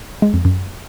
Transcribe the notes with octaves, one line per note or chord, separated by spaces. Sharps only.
G#3
F2
F#2